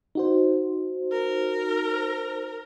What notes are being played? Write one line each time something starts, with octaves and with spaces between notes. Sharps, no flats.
D#4 F#4 C5
A#4